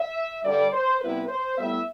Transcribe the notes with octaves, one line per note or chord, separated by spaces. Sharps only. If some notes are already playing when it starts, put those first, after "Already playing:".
Already playing: E5
G2 D3 G3 D5
C5
C3 G3 B3 E4 B4
C5
A2 G3 B3 E4 E5